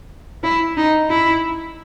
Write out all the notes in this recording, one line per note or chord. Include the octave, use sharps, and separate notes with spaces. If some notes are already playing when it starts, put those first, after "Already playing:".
E4
D#4
E4